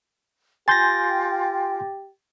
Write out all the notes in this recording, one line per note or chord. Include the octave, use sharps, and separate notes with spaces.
F4 G4 G5 G#5 C6 G6 A6 A#6